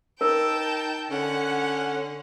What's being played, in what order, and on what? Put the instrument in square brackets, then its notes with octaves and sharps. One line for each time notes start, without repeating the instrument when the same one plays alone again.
[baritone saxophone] D#4 [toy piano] A#4 [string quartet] G5 A5
[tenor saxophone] D3 [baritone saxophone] C#4 [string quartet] F#5